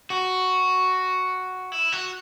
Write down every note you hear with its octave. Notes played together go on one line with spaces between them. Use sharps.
F#4
E4
F#4